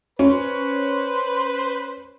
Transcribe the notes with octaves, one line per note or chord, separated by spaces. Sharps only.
C#4 B4 C5